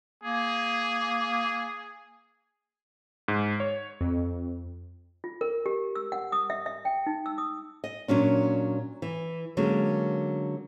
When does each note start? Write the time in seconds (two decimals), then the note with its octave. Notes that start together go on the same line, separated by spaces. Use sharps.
0.24 A#3 G#4
3.28 G#2
3.60 C#5
4.01 F2
5.24 F4
5.41 A#4
5.66 G4
5.95 E6
6.12 F#5
6.32 D#6
6.50 E5
6.66 E5
6.85 G5
7.07 D#4
7.26 E6
7.38 D#6
7.84 D#5
8.08 A#2 F#3 C#4 D4
9.02 E3
9.57 D3 F#3 G#3 A#3 C#4